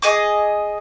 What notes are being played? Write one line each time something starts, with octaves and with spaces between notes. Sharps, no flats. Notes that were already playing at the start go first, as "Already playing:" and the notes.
G#4 D#5 D6